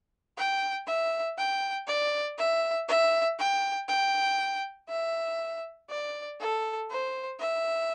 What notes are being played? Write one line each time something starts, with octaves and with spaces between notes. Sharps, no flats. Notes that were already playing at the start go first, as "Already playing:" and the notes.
G5
E5
G5
D5
E5
E5
G5
G5
E5
D5
A4
C5
E5